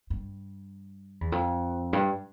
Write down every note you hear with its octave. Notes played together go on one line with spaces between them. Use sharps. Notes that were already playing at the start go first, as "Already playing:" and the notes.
G2
E2
F2
G2